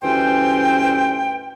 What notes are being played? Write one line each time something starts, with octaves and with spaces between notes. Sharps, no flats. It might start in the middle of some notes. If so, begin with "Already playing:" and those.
D2 G2 E3 C#4 C5 G5